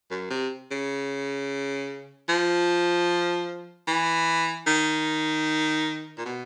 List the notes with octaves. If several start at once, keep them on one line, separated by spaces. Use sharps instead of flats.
F#2
C3
C#3
F3
E3
D#3
A#2
B2